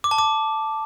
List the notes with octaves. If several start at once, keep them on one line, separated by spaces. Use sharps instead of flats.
D6
A5
D6